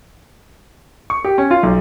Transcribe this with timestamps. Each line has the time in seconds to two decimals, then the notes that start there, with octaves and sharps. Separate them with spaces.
1.10 C#6
1.24 G4
1.38 C#4
1.51 F4
1.63 B1